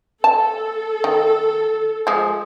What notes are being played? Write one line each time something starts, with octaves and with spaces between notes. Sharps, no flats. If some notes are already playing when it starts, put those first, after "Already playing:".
A4 A5
D#3
F3 G#3